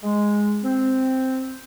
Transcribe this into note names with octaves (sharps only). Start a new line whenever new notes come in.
G#3
C4